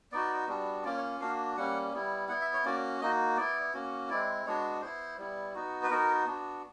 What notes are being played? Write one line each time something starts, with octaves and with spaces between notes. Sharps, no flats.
B3 D#4 F#4 D5
G3 B3 D4 F#4
A#3 C#4 F4 D5
C#5
A#3 D4 F#4 F5
G3 A#3 C#4 F#5
G3 B3 E4
B3 E4 F#5
E5
C#5
A#3 C#4 F#4 D5
A#3 D#4 F#4 D#5
B3 E4 D5
A#3 C#4 F#4
G#3 C4 E4 D5
G#3 B3 D4 F#4 C#5
B3 E4 C5
G3 B3 E4
B3 D#4 F#4
B4
B3 D#4 F#4 A#4
B3 D4 F#4